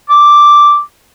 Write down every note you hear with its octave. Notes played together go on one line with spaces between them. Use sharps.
D6